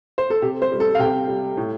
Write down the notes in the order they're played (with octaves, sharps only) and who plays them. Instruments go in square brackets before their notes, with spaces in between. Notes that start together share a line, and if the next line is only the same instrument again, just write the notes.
[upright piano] C5
A4
C3 G4
C5
G3
A4
F5
C3 G5
G3
A2